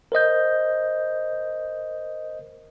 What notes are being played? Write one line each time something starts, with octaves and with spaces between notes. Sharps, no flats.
A#4 C5 D#5 G6